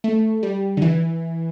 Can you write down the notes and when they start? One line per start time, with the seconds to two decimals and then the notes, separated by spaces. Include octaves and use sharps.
0.04 A3
0.43 G3
0.77 D3
0.82 E3